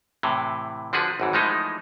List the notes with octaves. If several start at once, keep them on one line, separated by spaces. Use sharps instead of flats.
A2 C3 E3
D3 F3 D4 F#4 G#4 B4
G#1 F#2 E3
E3 F3 G#3 A3 D#4